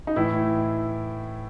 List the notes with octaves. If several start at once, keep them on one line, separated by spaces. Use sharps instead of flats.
D#4
A2 E3 E4